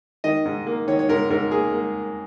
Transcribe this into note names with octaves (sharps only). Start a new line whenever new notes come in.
D#3 D#5
G#2
A#3
D#3 C#5
C#5
G#2 A#4
G#2 A#4
A#3 G#4
A#3